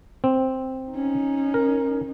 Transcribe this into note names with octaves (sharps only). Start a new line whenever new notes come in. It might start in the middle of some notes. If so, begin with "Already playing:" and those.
C4
C#4 D#4
A#4